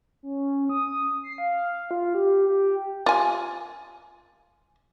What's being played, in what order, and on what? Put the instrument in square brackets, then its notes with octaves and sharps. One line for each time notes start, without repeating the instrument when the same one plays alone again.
[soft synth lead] C#4
D#6
C7
F5
F4
G4
G4
[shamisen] F4 G#5